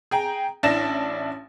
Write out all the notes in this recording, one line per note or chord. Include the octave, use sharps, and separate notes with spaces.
G#4 G5 A#5
A1 D4 E4 A5 A#6 E7